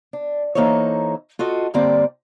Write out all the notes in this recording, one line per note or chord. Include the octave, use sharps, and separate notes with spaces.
D4
E3 A#3 D#4 A4 C5 C#5
F4 F#4 A4 D#5
G2 D3 A#3 C4 G4 D5